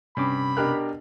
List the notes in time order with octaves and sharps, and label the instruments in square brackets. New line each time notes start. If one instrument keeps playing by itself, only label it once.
[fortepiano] G2 [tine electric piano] C3 C#4 D6 [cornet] B5
[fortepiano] B2 F6 F#6 [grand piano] D4 G4 A#4